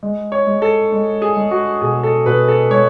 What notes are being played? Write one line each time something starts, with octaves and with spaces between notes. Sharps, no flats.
G#3
C#5
G#3
A4
G#3
G#4
G#3
F#4
B2 G#4
A4
B2 B4
A4
G#3 C#5